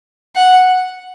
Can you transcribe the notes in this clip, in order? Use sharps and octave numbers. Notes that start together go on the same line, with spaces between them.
F#5